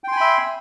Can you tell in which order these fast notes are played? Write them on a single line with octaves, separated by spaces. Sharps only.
G5 C6 G#5 B5 E5